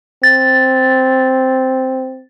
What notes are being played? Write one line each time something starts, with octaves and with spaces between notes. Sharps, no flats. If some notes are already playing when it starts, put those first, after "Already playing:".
C4 A6